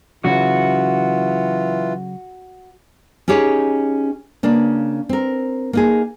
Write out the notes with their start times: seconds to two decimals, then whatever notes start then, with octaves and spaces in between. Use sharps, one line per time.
0.24 C#3 E3 F#3 F4 F#4
3.28 C#4 D#4 G4 G#4 C#5
4.43 C#3 A#3 D4
5.09 C4 A#4
5.73 A#3 D#4 G#4